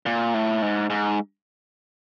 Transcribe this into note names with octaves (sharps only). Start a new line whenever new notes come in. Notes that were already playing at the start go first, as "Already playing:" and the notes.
A#2
A2
G#2
G#2